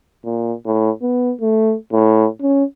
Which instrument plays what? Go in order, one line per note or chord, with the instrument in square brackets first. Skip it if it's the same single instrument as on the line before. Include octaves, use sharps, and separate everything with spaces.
[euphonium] A#2
A2
B3
A3
A2
C#4